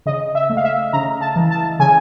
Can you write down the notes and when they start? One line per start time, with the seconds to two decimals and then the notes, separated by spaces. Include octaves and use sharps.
0.06 C#3 D#5
0.35 E5
0.50 A3
0.57 F5
0.64 E5
0.93 C#3 A#5
1.21 A5
1.36 E3
1.51 A5
1.80 C#3 G#5